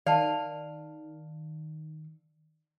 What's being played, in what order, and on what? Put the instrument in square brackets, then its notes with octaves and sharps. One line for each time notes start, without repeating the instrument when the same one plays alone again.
[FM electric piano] D#3 [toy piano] D5 A5 [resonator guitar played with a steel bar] F5